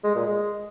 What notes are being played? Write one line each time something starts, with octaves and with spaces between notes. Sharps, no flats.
G#3
A#2
G#3